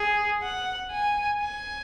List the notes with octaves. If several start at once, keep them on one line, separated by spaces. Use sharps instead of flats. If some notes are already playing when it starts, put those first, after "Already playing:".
Already playing: G#4
F#5
G#5
G#5